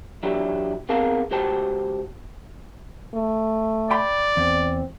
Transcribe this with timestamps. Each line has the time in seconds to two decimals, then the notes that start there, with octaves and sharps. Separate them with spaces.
0.23 E3 F#3 D4 E4 G4
0.89 B3 C4 G#4 A#4 F5 A5
1.31 C#2 F#4 G4 C5 G5 A5
3.14 A3
3.91 D5 G5 B5 C6
4.37 E2 C4